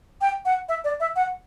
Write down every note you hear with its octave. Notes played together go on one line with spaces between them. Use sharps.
G5
F#5
E5
D5
E5
F#5